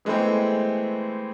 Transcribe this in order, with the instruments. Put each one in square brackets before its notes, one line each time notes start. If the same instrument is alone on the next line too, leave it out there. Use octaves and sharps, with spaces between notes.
[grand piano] E3 G#3 A3 B3 C4